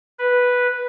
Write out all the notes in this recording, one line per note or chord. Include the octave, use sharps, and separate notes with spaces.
B4